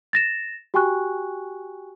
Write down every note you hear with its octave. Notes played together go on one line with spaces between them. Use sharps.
A6 A#6 E7
F#4 G4 G5 G#5 C#6 F#6